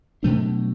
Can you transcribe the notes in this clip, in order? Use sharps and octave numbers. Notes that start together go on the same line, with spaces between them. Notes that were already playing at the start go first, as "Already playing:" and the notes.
B2 F#3 A3 D4